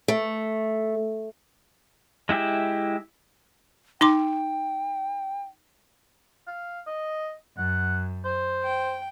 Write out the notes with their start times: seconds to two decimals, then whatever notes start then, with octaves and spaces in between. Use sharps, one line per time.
0.08 A3
2.29 G#3 E4 G4 E5
4.01 D#4 G5 C6 D6
6.47 F5
6.87 D#5
7.58 F#2 F#5
8.25 C5
8.64 G5